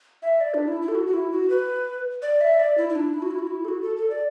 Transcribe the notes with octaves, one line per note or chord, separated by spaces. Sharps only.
E5
D5
D4
E4
E4
A4
F#4
F#4
E4
F#4
B4
D5
E5
D5
E4
E4
D4
E4
F#4
E4
F#4
E4
A4
F#4
A4
A4
D5